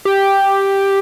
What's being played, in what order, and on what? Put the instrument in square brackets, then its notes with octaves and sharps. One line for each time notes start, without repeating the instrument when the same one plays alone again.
[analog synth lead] G4